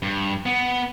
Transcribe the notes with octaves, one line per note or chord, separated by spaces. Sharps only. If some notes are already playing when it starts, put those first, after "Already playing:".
G2
B3